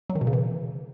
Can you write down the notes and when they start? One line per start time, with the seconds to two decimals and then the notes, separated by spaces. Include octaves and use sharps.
0.10 F#3
0.15 D#3
0.21 B2
0.27 C#3
0.33 E3